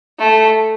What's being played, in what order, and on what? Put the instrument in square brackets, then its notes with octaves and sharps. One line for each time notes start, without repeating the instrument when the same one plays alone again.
[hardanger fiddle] A3